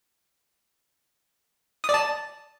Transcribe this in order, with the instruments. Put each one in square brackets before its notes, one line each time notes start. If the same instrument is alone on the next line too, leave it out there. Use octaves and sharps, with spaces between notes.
[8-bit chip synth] D#6
D5
A5